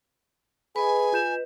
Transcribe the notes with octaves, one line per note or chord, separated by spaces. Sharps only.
G#4 B4 D#5 G#5 B5
F4 G6 E7